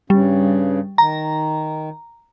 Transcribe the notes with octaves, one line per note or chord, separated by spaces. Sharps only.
G2 C#3 G3
D#3 A#5